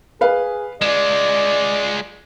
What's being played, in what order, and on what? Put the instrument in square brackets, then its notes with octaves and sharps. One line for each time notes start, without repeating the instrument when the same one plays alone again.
[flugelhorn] G#4 [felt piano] B4 F5
[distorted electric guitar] G#3 F4 [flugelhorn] D5 [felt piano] E7